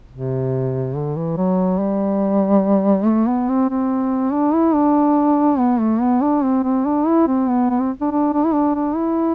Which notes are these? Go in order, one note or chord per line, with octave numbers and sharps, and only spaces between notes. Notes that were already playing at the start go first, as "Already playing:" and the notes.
C3
D3
E3
F#3
G3
A3
B3
C4
C4
D4
E4
D4
B3
A3
B3
D4
C4
C4
D4
E4
C4
B3
B3
C4
D4
D4
D4
E4
D4
D4
E4